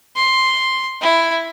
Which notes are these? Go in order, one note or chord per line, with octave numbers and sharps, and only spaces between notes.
C6
E4